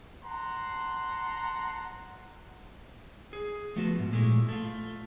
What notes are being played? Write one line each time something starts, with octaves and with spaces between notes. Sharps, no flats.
F#5 A5 A#5 C6
G#4
F3 A3 B3 F4 F#4
G#2
A#2 G#3 A3 E4
A3 F4